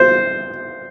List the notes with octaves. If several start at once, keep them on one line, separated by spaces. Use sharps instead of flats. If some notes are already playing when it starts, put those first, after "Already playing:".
Already playing: C5